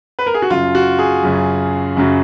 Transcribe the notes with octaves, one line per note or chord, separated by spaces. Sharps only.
B4
A#4
G#4
F#4
F#2 C#3 F#3 F4
F#4
G#4
F#2 C#3 F#3
F#2 C#3 F#3